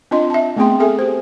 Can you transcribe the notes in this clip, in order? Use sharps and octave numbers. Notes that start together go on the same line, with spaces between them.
C4 D4 F4 D#5 C6
E5 A5
A3 B3 C4 G#4 G5 C6
G#4 A4 E5 G#5
G4 C5